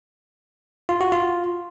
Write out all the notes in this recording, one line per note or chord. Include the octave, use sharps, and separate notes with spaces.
F4
F#4
F4